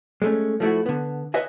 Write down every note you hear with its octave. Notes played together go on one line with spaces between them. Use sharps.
G#3 A3 C#4
F3 A3 E4 F#4
D3 B3
B4 C#5 D#5 E5 G#5